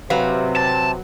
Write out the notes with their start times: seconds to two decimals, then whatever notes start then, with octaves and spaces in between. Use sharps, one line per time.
0.10 C3 F#3 B4 F5
0.56 A5